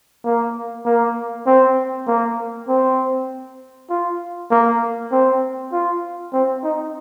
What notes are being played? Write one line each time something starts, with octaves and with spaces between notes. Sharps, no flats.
A#3
A#3
C4
A#3
C4
F4
A#3
C4
F4
C4
D#4